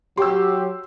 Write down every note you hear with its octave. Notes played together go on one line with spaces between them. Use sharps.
F#3 G4 C6 E6